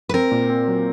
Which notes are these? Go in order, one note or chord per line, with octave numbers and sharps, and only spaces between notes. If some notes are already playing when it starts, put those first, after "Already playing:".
B4
C4 A#4
A#2
C4
F#3